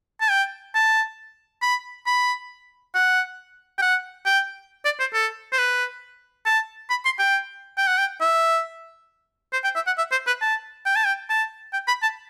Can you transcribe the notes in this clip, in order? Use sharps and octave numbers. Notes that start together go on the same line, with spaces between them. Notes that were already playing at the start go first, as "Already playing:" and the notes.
A5
G5
A5
B5
B5
F#5
G5
F#5
G5
D5
C5
A4
C5
B4
A5
B5
C6
G5
G5
F#5
G5
E5
C5
G5
E5
F#5
E5
C5
B4
A5
G5
A5
G5
A5
G5
B5
A5